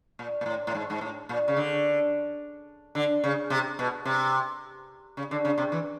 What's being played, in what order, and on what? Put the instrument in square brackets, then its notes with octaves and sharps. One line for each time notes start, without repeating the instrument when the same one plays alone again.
[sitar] A#2
A#2
A2
A2
G#2
G#2
A2
A#2
C#3
D3
D3
C#3
C3
B2
C3
C#3
D3
C#3
C3
E3